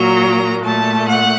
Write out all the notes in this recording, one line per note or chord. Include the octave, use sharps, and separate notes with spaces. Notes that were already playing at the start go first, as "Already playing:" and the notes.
Already playing: A#2 F#3 A#3 A#5
A#2 A3 A5
F#5